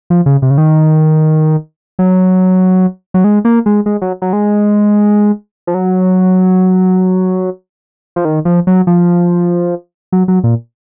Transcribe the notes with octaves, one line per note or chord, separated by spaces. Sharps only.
F3
C#3
C3
C#3
D#3
F#3
F#3
G#3
A#3
G#3
G#3
F#3
F#3
G#3
F3
F#3
F3
D#3
F3
F#3
F3
F#3
F#3
A#2